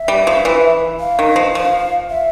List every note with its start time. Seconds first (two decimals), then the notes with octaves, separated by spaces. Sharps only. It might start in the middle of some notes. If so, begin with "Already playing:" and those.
Already playing: E5
0.08 G3
0.27 F3
0.45 E3
0.99 F5
1.19 D#3
1.36 F3
1.55 F3 F5
2.10 E5